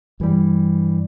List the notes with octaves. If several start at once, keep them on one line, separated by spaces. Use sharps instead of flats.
G2 E3 G3